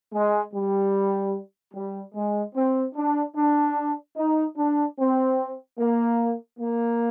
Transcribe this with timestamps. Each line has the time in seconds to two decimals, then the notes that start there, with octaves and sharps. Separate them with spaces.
0.13 G#3
0.53 G3
1.74 G3
2.15 G#3
2.55 C4
2.95 D4
3.36 D4
4.16 D#4
4.57 D4
4.98 C4
5.78 A#3
6.59 A#3